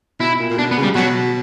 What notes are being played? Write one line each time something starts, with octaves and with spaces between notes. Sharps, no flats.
B2 E4
A#2
A#2
B2 D4
B3
C#3
G3
B2 F#3